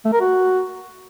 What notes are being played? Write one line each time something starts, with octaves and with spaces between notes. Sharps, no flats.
A3
A#4
F#4